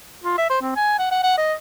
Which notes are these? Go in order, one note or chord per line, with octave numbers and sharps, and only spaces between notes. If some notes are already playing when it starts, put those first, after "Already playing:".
F4
E5
C5
C4
G#5
F#5
F#5
F#5
D#5